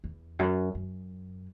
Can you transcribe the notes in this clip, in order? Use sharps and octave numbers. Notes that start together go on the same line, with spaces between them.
E2
F#2
F#2